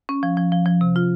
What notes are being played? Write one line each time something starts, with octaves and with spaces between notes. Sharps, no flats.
C#4
F3
F3
F3
F3
C3
F4